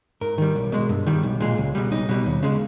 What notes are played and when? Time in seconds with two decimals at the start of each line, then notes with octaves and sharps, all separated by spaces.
0.21 G#2 A#4
0.38 D#3 G3
0.55 B1
0.72 B2 G#3
0.89 G2
1.07 D#3 G3
1.23 B1
1.40 A#2 G#3
1.58 C#2
1.75 B2 G3
1.92 B1 D#4
2.09 B2 G3
2.26 D#2
2.43 C#3 G#3